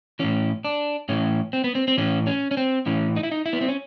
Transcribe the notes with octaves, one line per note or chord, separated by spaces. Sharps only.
A2 E3 C#4
D4
A2 E3 C#4
C4
B3
C4
C4
A2 E3 C#4
C#4
C#4
C4
A2 E3 C#4
D#4
E4
D#4
E4
B3
C4
C#4